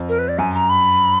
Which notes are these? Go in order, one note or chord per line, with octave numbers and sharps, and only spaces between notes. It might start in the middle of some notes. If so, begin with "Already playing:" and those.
Already playing: F2
A#4
B4
D5
F#2 G#5
A#5
B5